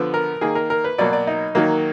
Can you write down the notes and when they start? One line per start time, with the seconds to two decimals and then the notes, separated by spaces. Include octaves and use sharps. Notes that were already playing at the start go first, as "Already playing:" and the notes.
Already playing: D3 F3 B3
0.14 A#4
0.41 D#3 A#3 G#4
0.55 A#4
0.70 A#4
0.84 B4
0.98 B2 F#3 A#3 D5
1.13 D5
1.27 D#4
1.55 D#3 F#3 A#3